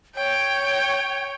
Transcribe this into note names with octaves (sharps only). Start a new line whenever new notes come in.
C#5 G5